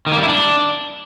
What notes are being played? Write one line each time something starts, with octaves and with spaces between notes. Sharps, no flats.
D#3
A#3
G3
E4
D4